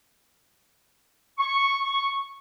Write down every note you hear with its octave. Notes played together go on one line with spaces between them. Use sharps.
C#6